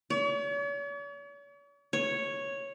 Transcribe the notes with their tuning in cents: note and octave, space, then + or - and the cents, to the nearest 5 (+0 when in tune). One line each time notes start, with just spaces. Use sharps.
C#5 +45
C#5 -5